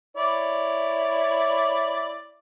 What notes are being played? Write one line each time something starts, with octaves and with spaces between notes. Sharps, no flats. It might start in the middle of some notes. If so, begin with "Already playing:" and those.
E4 C#5 D5